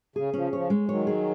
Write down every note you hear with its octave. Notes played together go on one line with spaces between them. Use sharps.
C#3 G#4
C#3 F3 C#4
C#3 F3 C#5
G#3
D#3 F#3 C#5
G#4